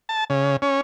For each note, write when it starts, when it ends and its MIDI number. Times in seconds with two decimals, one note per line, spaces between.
0.09 0.24 81
0.30 0.56 49
0.62 0.81 61